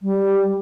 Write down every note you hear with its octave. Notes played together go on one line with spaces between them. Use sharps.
G3